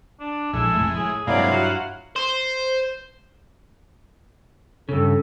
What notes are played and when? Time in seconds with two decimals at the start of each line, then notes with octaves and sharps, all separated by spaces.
0.20 D4
0.53 A#1 G#3 E4 A4
0.75 F1 C#2 A3
0.95 A2 G#4
1.27 G2 C3 F#3 G#3 A#3 E4 D5 F5
1.51 F4 F#4 F#5
2.16 C5
4.89 G2 C#3 A4